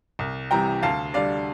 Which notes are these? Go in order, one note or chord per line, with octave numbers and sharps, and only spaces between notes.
C2
C3 E3 G3 G5 A#5
D2 F5 A5
D3 G3 D5 F5